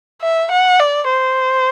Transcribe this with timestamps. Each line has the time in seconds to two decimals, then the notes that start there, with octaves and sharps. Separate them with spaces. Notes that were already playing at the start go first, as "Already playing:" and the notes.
0.22 E5
0.51 F#5
0.80 D5
1.09 C5